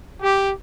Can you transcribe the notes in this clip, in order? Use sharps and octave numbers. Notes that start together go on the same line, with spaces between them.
G4